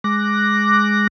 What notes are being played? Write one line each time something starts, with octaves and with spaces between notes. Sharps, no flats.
G#3 D6 F#6 A#6